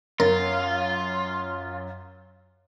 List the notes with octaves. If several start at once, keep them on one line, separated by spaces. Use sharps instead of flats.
F#2 F4 A#4 A6